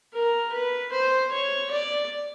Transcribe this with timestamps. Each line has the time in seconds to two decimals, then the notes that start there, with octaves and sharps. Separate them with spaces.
0.13 A#4
0.52 B4
0.92 C5
1.31 C#5
1.71 D5